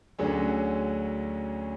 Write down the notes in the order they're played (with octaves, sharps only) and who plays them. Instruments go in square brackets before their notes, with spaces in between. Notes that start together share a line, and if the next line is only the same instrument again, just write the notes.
[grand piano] D2 D3 F#3 C#4 G#4